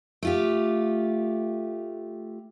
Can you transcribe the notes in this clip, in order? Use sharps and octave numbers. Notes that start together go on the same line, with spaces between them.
A3 F4 G4